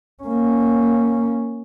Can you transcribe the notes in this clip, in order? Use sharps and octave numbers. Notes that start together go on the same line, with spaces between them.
A#3 C#4